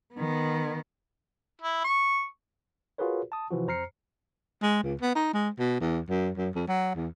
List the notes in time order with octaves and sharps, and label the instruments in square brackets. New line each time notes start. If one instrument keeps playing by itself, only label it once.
[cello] D#3 B3
[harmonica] E4
C#6
[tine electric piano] F4 F#4 G#4 A#4 B4 C#5
A5 D#6
C3 E3 F3 F#4
F2 C5 A#5 F6 C7 C#7
[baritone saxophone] G#3
C#2
B3
D#4
G#3
B2
E2
F#2
F#2
F2
F#3
E2